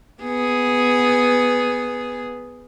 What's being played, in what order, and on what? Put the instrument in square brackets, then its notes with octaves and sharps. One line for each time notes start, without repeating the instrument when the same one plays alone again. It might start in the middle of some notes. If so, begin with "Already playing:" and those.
[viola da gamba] B3 G#4